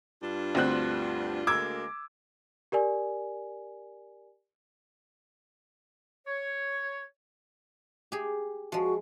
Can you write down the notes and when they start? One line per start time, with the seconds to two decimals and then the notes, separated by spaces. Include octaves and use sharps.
0.21 G2 D4 F4
0.55 D2 C4 F#6
1.47 D2 G#3 A#3 D6 E6 G#6
2.72 G4 A#4 D5 G#5
6.27 C#5
8.12 G4 G#4
8.72 F3 G#3 F#4